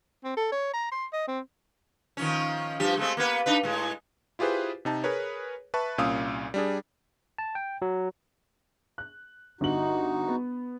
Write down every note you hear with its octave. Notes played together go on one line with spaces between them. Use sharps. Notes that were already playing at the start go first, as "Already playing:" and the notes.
C4
A4
C#5
A#5
C6
D#5
C4
D#3 F3 C#4
G2 F3 G4
G#3 A3 C4
A#3 B3 B4
D4 D#4 B4
A2 G#3
E4 F4 G4 G#4 B4 C5
C3 D#4 A5
G#4 A#4 B4 C#5
B4 E5 A5 C#6
C2 A#2 C#4 F5 D#6 E6
G3 D4 G#4
A5
G5
F#3
F#6
G1 D#4 F#4 F#7
B3